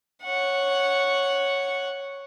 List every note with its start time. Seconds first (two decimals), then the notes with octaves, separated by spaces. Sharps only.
0.24 C#5 F#5